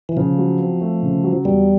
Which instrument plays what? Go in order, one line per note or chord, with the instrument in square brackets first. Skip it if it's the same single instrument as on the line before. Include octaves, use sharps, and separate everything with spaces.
[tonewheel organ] E3
[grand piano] C#3 [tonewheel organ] F3
[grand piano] F#3
C4
A3
C#3
F#3
[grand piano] E2 [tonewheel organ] G3